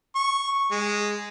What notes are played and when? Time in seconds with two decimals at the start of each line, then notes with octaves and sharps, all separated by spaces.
0.15 C#6
0.71 G#3